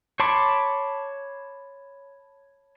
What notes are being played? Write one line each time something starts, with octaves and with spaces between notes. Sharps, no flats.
C#5 A5 B5 C6 D6